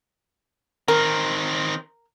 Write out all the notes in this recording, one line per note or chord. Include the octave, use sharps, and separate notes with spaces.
D#3 C4 A#4